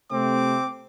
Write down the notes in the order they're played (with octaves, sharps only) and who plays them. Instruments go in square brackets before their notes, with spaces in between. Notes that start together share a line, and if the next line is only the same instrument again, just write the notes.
[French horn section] C3 A3 [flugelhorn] C4 [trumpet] D6